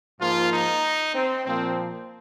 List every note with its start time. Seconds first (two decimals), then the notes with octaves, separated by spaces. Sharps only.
0.20 G#2 F3 A#3 F4
0.52 D#4
1.14 C4
1.45 A#2 F3 A#3 C4